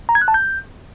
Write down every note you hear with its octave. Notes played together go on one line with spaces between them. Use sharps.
A#5
G#6
F#6
A5
G6